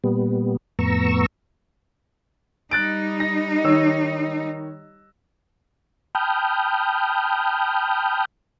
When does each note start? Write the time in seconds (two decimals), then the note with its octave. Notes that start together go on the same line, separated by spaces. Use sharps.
0.04 A#2 G3 B3
0.79 F2 A2 B3 A#5 C#6 E6
2.71 G3 D#4 F#6 A6 D7
3.20 A#6
3.64 D#3 C#5 E6
6.15 G5 A5 B5 D#6 F6 G6